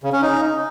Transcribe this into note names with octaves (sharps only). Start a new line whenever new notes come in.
C#3
C#4
D#4